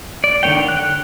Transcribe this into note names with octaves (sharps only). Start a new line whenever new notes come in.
D5
D3 D#3 A#3 C#5 G5
F#6